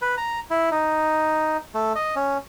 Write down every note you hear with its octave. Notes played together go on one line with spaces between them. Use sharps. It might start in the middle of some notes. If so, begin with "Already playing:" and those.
B4
A#5
E4
D#4
A3
D#5
C#4